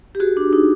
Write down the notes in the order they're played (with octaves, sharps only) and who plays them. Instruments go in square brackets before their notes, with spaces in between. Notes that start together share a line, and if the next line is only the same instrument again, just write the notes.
[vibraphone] G4
F#4 G#4
D4
D#4